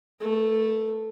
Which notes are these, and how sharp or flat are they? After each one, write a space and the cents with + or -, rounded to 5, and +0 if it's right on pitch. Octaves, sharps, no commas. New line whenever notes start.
A3 +0 B4 -45